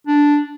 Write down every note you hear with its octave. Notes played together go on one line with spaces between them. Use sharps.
D4